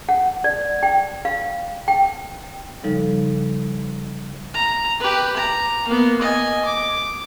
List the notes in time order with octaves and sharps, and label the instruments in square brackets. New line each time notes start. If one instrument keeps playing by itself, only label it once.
[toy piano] F#5
D5
G5
F5
G5
[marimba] C#3 F3 G3 D#4 A4
[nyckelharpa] A#5
G4 B4
A#5
A#3 B3
D#5 G#5
D6